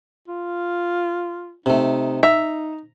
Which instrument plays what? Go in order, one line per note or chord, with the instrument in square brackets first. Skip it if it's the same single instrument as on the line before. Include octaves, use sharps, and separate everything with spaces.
[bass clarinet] F4
[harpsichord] C3 A3 [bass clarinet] D#4
[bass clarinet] D#4 [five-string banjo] E5 [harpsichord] A#5